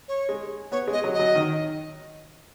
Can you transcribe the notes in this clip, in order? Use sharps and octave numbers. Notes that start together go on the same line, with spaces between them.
C#5
G#3
B3 C#5
G#3
D#5
F#3
D#5
F#3
D#3